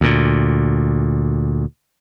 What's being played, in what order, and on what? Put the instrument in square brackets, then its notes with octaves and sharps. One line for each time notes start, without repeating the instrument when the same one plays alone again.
[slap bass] D2 A#2